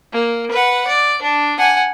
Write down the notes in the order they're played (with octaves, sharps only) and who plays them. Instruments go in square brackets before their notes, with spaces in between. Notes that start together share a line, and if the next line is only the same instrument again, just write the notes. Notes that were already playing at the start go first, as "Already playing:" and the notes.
[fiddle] A#3
B4 F#5
D5
D4
F#5 G#5